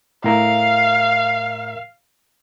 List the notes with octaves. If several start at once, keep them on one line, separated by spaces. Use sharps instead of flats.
A2 A#4 E5 F5